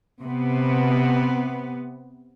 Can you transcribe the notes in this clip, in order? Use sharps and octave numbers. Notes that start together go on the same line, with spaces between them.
C3 B3